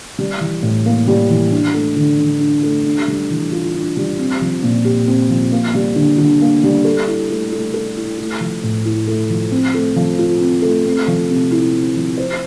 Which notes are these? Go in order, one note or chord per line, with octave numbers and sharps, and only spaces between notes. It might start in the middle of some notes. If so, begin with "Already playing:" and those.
G3
E3
A2
A#3
G3
E3
D4
A3
D3
D3
D4
A3
D4
G3
E3
F4
D4
G3
C4
F3
A#2
G4
C4
F3
A#3
G3
D3
D3
A#3
G3
A4
E4
A3
A3
A4
E4
A3
F3
A2
E4
A3
F3
C4
A3
F3
F4
C4
A3
C4
F3
C3
E4
C4
F3
C5